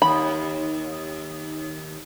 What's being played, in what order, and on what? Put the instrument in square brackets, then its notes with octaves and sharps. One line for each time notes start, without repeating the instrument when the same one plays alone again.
[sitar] D#2 [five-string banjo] B5